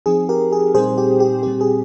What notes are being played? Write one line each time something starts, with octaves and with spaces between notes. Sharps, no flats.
F3 C4 D#4 G#4
G4 A#4
G#4
A#2 G3 C4 D#4 G#4 C5
G4
G4
A#2 G3 C4 G4
G#4